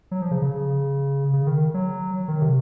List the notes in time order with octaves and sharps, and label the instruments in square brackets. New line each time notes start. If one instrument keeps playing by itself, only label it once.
[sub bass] F#3
F3
C#3
C#3
C#3
D#3
F#3
D#3
C3